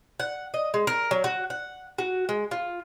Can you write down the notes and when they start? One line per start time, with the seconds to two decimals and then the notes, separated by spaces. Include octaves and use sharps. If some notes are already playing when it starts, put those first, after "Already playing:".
0.20 F#5
0.54 D#5
0.74 G#3
0.87 A#4
1.11 F#3
1.24 F#4
1.50 F#5
1.98 F#4
2.29 G#3
2.51 F4